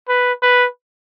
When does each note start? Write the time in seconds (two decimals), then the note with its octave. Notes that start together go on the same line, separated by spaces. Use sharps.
0.09 B4
0.43 B4